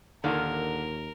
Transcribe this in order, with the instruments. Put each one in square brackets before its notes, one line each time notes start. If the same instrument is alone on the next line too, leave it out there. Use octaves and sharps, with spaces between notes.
[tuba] D#2 [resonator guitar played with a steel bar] A#2 D#3 A#3 [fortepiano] D3 [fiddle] A#4